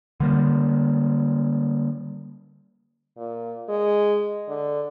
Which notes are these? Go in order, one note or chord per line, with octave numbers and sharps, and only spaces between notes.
D3 G3 A#3
A#2
G#3
D3